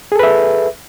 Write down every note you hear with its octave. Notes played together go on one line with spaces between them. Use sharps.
G#4 A4 B4 E5